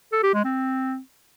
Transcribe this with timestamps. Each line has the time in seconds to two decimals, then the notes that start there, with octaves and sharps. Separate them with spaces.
0.13 A4
0.23 G4
0.34 G#3
0.44 C4